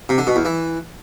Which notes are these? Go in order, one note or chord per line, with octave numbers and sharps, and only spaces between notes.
C3
D3
B2
E2
E3